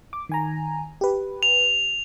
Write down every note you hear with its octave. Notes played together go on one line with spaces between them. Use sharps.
D6
D#3 G#5 A#5
G4 B4
F7